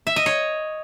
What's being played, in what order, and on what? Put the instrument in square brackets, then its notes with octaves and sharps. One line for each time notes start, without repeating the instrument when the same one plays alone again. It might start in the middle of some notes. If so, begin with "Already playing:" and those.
[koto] E5
D#5
C#5